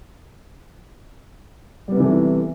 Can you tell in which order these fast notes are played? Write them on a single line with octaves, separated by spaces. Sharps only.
G3 B3 C3 E3 A3